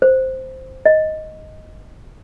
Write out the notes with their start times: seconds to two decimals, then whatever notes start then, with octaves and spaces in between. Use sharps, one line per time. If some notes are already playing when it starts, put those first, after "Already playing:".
0.02 C5
0.86 D#5